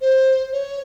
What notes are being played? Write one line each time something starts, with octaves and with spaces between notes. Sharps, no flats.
C5
C#5